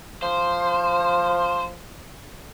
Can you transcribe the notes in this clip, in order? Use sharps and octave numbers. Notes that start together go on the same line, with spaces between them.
F3 C5